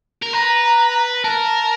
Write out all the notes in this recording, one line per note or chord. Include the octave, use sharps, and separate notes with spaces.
A#4
B4 A#5
A#4 A5